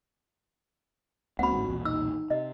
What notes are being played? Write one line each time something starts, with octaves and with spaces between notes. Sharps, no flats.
C#2 C#3 A#3 C4 F#4 F#5 B5
G1 G#2 D3
B1 E2 A#2
D#4 E6
C3 D#5